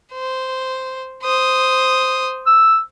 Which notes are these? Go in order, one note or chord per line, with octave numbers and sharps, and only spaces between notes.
C5
C5 D#6
E6